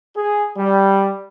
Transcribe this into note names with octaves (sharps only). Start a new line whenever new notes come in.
G#4
G3